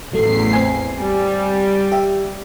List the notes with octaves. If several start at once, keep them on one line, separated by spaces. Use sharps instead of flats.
A1 E2 F#3 A3 C7
C4 G#5
G3
G4 E5